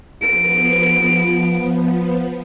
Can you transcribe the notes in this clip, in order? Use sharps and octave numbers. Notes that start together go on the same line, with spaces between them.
F3 B3 D7